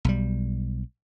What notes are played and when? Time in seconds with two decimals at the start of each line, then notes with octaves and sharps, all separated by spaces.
0.05 B1 G3